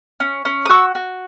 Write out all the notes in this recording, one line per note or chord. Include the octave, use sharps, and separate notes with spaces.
C#4
C#4
D#6
F#4 C#6 E6
F#4